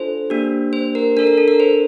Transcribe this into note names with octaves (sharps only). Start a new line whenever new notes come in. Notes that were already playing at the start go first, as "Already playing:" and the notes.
Already playing: D4 F4 A4 C5
A#3 D4 G4
C5
A#4
D4 A4 A#4
A#4
A4
A#4
C5